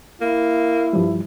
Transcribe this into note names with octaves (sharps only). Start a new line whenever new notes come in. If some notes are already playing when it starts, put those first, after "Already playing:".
A#3 E4
G2 F3 G3